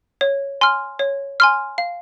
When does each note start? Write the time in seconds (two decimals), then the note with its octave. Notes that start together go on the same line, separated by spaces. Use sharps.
0.21 C#5
0.61 G#5 C6 F6
0.99 C#5
1.40 G#5 C6 F6
1.78 F5